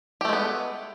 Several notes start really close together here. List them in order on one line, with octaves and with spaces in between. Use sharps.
G4 A3 G#3 B3